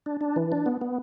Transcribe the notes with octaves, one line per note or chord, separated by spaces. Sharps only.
D4
D4
E3
D4
B3
B3